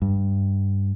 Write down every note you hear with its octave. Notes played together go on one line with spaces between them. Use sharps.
G2